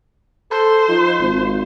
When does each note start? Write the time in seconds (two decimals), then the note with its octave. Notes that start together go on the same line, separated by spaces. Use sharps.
0.51 A4 C5
0.89 F3 D#4
1.21 G#1 F4